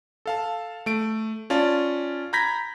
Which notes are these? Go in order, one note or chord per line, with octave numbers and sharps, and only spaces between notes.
A4 F5 A5
A3 D7
C#4 F4 D5 A5 A6
A#5 B5 G6 G#6 A#6 B6